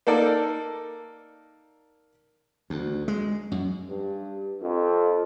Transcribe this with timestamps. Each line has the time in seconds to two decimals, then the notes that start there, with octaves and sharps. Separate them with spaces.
0.07 A#3 D#4 A4 D5
2.70 D2
3.08 G#3
3.51 F#2
3.90 G2
4.62 F2